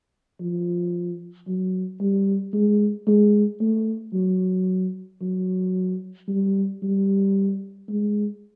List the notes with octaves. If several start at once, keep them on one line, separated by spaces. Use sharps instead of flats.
F3
F#3
G3
G#3
G#3
A3
F#3
F#3
G3
G3
G#3